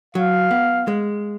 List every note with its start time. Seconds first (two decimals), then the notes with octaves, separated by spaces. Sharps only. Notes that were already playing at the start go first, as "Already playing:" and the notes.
0.15 F#3 F5
0.51 B3
0.88 G#3